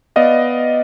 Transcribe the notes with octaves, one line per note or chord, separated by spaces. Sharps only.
B3 D5 D#5 F5